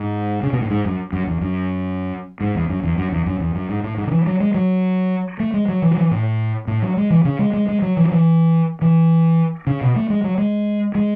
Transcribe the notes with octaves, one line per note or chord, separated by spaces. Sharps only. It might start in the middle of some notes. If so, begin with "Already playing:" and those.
Already playing: G#2
C#3
B2
A2
G#2
F#2
F#2
E2
F#2
G#2
E2
F#2
E2
F#2
E2
F#2
E2
F#2
G#2
A2
G#2
D3
E3
F#3
G#3
F#3
A3
G#3
F#3
E3
F#3
E3
A2
A2
F#3
G#3
E3
C#3
G#3
G#3
G#3
F#3
E3
F#3
E3
E3
C#3
B2
A3
G#3
F#3
G#3
G#3